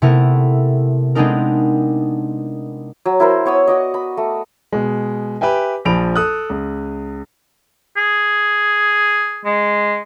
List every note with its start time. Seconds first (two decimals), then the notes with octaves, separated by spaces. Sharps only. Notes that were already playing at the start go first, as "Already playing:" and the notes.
0.02 C3 A3 B3 E4 A#4
1.15 G#3 B3 C4 D4 D#4 A#4
3.05 F#3
3.20 E4 A#4 C5
3.46 B3 C#5 D#6 E6
3.67 F#4 D5 D#5
3.94 B5
4.17 A3
4.72 B2 G#3
5.41 G4 B4 E5 G5 G#5
5.85 A#1 F3 G#5 B5 D7 F7
6.16 A4 D#6 F#6
6.50 C#2
7.97 G#4
9.45 G#3